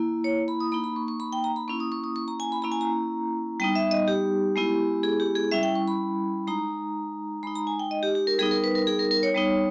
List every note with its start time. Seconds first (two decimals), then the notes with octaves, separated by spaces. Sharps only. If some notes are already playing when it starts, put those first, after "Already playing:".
Already playing: A#3 E4
0.24 C#5
0.48 B5
0.60 D#6
0.72 A#3 D#4 B5
0.84 B5
0.96 C#6
1.08 C#6
1.20 B5
1.33 G5
1.44 A#5
1.56 B5
1.68 A#3 C#4 E4 C#6
1.80 D#6
1.92 C#6
2.04 D#6
2.16 C#6
2.28 A#5
2.40 G#5
2.52 B5
2.62 A#3 C#4 E4 A#5
2.72 G#5
2.81 A#5
3.60 G3 B3 D#4 G5
3.75 E5
3.91 D#5
4.08 G4
4.56 G#3 B3 E4
5.03 G#4
5.20 G4
5.35 G#4
5.51 G3 C#4 E4 E5
5.63 G5
5.75 C#6
5.88 B5
6.47 G#3 D#4 A#5
7.43 G#3 D#4 B5
7.55 A#5
7.67 G#5
7.79 G5
7.91 D#5
8.03 G4
8.15 G4
8.27 A#4
8.39 G3 B3 D#4 G#4
8.51 A#4
8.64 B4
8.75 A#4
8.87 G#4
8.99 A#4
9.11 A#4
9.23 C#5
9.35 G3 B3 D#4